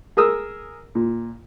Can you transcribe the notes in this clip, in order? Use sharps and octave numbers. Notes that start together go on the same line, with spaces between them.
G#4 A#4 D#6 E6
A#2